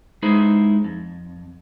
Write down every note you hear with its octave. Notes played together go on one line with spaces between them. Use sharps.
G#3 D#4 E4 G#4 B4 C5
F2